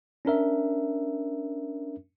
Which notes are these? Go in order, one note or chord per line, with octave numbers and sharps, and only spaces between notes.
C#4 D4 A#4 E5